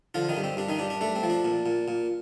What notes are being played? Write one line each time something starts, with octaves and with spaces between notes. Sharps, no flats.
D3 F3 F4
D#3 D#4
G2
C4
G2 D4
D#3 D#4
G2 D4
D4
A3 D4
C4
F3
D4
A#2
A#2
A#2